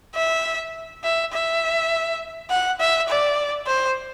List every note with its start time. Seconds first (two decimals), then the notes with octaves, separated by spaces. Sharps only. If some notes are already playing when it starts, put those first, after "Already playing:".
0.16 E5
1.04 E5
1.33 E5
2.51 F#5
2.80 E5
3.09 D5
3.67 C5